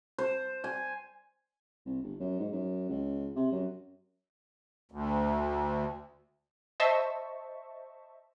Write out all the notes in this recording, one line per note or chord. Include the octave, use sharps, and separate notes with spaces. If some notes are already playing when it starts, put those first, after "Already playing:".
C5
G#5
C2
G1
F#2
G#2
F#2
C#2
C3
F#2
D2
C5 D#5 E5 A5 C#6